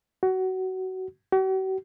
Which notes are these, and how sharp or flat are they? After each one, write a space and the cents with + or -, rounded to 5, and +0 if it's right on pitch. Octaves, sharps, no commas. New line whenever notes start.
F#4 +20
F#4 +45